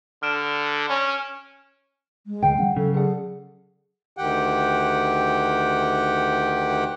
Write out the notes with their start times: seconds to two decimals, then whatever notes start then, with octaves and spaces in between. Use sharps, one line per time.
0.23 D3 F6 D7 E7
0.89 C#4
2.27 G#3
2.43 D2 D3 F5 G5
2.59 F3 G3 C#4 F#5
2.76 C#3 F#3 A4
2.94 G#4 A4 D5 F#5
4.17 D2 D#3 G4 F#5 G5